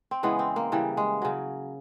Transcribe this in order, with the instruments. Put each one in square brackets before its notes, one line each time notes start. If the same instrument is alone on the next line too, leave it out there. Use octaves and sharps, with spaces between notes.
[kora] C4
C#3 E3 G#3 B3
C4
A#3
C#3 E3 G3
G#3
C#3 F#3